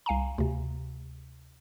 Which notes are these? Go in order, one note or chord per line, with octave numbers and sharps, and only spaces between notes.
C2 F5 G#5 A#5
D2 C3